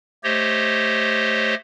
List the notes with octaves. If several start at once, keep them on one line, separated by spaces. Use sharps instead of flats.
A3 G4 C5 C#5 D#5